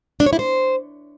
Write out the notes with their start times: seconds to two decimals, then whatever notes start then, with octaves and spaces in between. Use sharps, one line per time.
0.20 D4
0.26 C#5
0.33 E4
0.39 C5